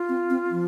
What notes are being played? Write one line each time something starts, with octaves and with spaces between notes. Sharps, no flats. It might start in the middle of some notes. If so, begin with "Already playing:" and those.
Already playing: F4
C4
C4
F3